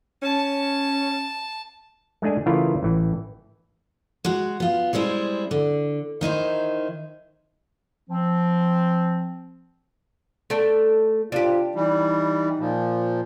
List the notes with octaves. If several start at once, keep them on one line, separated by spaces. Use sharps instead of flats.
C#4 A5
G#3 A3 D4 G#4 G#5
C#3 E3 A3 E4 F4 A#4
A1 E3
G#3 F#4
B3 F4
G3 G#3 C4 E4 G#4
D3
D#3 D#4 E4 C5
F3 C4
A3 A4 D5
C3 D4 F4 G4
E3 G3 D#4
A#2 F3